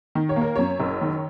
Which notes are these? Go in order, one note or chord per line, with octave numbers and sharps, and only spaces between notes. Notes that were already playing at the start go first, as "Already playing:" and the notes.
D#3
C#5
A#3
A#4
F#2 C#5
F#1
D#3